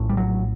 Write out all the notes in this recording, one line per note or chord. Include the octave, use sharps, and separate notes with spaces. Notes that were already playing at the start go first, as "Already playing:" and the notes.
Already playing: A#1 A2
G3
F#3